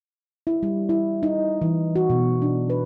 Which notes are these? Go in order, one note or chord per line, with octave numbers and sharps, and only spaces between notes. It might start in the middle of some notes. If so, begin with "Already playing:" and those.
E4
G3
E4
D#4
E3
F#4
B2
D4
B4